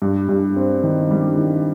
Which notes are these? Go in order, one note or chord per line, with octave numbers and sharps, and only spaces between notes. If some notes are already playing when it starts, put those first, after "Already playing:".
G2
G2
C4
D#3
G3
D#3